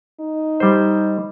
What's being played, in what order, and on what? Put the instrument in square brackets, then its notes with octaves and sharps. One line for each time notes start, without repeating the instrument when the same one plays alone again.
[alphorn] D#4
[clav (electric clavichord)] G3 C5